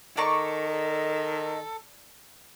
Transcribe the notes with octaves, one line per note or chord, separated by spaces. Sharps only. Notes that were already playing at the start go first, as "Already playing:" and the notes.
D#3 A4 D5 D#5 A#5 C#6